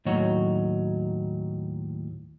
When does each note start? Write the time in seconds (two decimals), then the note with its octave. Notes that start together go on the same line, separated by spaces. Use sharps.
0.06 D#2 A2 F#3 D#4 F#4 C#5